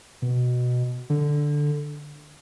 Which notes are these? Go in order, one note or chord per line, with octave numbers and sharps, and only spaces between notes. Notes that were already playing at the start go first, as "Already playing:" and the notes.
B2
D3